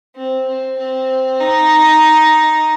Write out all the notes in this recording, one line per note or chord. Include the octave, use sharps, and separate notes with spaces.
C4
C4
C4
D#4